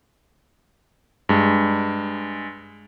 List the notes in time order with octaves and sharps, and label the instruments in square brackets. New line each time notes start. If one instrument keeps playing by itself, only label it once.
[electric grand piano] G2 G#3